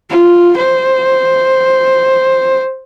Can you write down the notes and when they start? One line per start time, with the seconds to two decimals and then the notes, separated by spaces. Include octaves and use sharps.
0.10 F4
0.57 C5